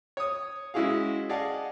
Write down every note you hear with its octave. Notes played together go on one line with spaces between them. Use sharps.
C#5 D#6
G#3 C#4 E4 F#4 G#4 F5
G#4 D5 D#5 F5 F#5 A5